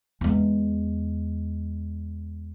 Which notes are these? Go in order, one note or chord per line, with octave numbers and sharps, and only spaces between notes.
E2 G#3